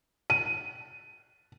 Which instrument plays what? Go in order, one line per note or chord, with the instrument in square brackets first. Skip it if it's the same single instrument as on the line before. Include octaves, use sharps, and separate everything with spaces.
[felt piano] D#7